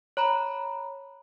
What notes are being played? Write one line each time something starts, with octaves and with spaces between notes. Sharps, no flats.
C#5 A#5 B5